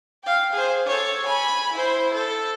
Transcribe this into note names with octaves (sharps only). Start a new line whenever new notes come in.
F5 G5
G#4 C5
A4 C#5
G#5 B5
E4 C5
A4